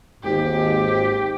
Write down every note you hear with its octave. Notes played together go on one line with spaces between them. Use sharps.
G#1 D#2 G#2 G4